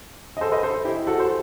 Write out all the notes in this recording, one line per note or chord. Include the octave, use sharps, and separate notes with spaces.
D#5
A4 C5
B4 D#5
A4 C5
E4 G4
F#4 A4
C5